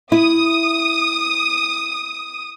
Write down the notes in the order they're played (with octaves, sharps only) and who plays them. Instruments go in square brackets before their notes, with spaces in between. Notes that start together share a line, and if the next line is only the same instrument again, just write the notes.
[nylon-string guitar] E4 [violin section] D#6